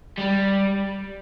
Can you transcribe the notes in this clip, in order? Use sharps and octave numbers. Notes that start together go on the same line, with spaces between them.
G3